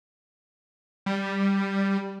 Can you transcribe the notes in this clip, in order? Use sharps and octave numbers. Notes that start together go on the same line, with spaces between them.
G3